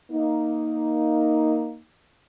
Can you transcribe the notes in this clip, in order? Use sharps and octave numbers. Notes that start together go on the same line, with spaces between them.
A#3 D#4